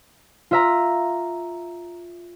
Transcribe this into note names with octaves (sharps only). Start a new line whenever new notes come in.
F4 E5 A#5